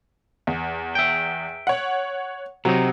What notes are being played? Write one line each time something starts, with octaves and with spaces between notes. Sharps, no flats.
E2
E5 G5
C#5 F#5
C3 F#3 D#4